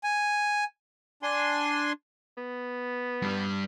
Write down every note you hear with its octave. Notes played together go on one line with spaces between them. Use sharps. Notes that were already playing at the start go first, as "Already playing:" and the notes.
G#5
D4 G#5 C6
B3
G2 G3